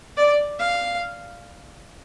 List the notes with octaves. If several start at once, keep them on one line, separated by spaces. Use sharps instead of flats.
D5
F5